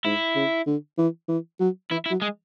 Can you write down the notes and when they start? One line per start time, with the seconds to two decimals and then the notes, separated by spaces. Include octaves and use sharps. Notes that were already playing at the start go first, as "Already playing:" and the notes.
0.05 G#2 E4
0.35 C#3
0.67 D3
0.98 E3
1.29 E3
1.60 F#3
1.91 E3 E4
2.06 E4
2.11 F#3
2.22 G#3